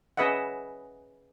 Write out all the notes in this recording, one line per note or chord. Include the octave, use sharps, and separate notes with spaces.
C#4 G#4 B4 D#5 E5 F#5